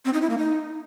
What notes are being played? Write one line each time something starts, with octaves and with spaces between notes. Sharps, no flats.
C4
D#4
E4
A#3
D#4